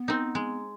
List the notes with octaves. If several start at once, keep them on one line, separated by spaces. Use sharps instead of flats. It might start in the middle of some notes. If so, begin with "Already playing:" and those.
Already playing: B3
C4 D#4
G#3